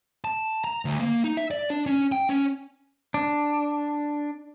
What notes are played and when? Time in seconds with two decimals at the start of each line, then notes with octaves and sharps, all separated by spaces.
0.25 A5
0.64 A#5
0.85 D2
0.99 A#3
1.24 D#4
1.37 E5
1.51 D5
1.70 D4
1.86 C#4
2.12 G5
2.29 C#4
3.14 D4